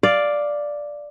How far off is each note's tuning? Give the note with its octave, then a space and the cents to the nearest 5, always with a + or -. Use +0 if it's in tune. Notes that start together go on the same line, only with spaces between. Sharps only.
D5 +0 F5 +0